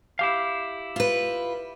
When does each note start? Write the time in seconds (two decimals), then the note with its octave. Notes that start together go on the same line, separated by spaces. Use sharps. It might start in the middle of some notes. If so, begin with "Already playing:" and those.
0.19 E4 G4 F5
0.96 F4 B4